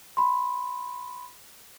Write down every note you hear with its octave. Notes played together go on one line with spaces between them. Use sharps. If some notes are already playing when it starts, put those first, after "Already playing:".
B5 C6